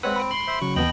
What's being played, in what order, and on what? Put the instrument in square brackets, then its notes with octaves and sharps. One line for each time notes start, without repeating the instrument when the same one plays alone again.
[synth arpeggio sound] G#3 C#5 E6 [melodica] C4 [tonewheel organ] B4 F#5
[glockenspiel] B5 D7
[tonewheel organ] C6 [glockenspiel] F#7
[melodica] C5 E5
[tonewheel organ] C#3 F#3 [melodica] C#6
[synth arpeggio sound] D#2 E3 B3 [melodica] D#5 G5 [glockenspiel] A5 F#7